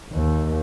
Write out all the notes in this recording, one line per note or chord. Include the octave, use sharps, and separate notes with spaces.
D#2